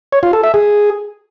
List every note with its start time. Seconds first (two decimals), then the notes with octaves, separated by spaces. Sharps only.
0.12 C#5
0.23 F4
0.33 A4
0.44 E5
0.54 G#4